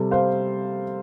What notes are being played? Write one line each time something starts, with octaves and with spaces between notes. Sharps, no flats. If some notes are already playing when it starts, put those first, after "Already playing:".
Already playing: C3 G3 A4
C5 F5